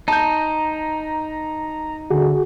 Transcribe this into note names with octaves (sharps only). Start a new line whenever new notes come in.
D#4 A5 A#5 G6
D3 F#4 G#4